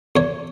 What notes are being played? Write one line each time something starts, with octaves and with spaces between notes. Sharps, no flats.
E2 C#5